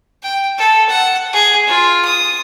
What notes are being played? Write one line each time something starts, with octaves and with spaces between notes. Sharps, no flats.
G5
A4
F#5
G#4
F4
D#6